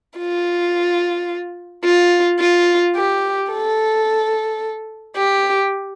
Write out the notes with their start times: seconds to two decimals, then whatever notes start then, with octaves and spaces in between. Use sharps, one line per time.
0.19 F4
1.85 F4
2.40 F4
2.96 G4
3.51 A4
5.16 G4